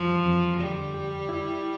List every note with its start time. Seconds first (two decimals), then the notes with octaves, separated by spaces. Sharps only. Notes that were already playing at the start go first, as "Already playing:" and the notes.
Already playing: F2 E3 F3 G3
0.25 F2
0.60 D3 G3
0.94 G4
1.29 E4